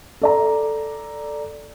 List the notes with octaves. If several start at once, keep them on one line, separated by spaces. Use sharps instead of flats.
A4 D5 A#5